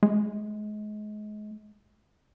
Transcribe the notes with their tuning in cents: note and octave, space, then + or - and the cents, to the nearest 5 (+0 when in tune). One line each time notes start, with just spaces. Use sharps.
G#3 +30